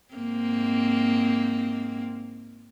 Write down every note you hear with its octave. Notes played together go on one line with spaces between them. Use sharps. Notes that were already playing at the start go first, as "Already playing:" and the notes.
G#2 A#3 C4